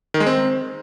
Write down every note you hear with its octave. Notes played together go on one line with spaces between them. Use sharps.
D#3
G#3
C4